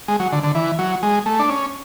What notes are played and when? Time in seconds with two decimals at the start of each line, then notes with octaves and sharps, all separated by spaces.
0.08 G#3
0.20 F#3
0.32 D3
0.44 D3
0.55 E3
0.79 F#3
1.03 G#3
1.26 A3
1.39 D4
1.49 C#4